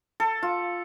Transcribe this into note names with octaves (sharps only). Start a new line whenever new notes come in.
A4
F4